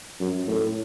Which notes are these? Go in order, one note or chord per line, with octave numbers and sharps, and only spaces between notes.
F#2
A2